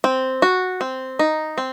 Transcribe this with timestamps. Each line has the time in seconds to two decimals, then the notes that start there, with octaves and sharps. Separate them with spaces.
0.04 C4
0.42 F#4
0.81 C4
1.19 D#4
1.58 C4